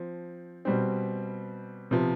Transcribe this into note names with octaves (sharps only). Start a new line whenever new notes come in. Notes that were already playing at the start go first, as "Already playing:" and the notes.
Already playing: F3 C4
B2 G3 C4
C3 F3 B3